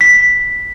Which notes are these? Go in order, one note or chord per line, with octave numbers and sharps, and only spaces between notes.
B6